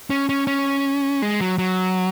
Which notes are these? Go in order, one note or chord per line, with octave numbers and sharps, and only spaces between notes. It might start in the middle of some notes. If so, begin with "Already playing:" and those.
C#4
C#4
C#4
G#3
F#3
F#3